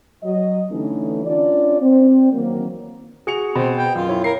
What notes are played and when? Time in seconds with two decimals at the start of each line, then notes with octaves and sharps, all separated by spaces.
0.24 F#3 D#5
0.70 D3 E3 G3 A3 C#4 D#4
1.26 C#4 D4 F4 D5
1.80 C4
2.32 D#3 E3 F#3 A#3
3.27 F#4 G#4 C#7 F7
3.55 B2 C4
3.77 G5
3.95 F#2 F4
4.09 E4 C#5
4.24 A#4 C7